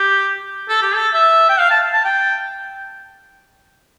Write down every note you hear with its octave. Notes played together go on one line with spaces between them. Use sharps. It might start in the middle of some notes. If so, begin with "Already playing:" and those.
Already playing: G4
A4
G4
A4
E5
G5
F5
A5
A5
G5